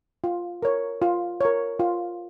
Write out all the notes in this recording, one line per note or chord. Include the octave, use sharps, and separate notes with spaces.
F4
A#4 C#5
F4
A#4 C#5
F4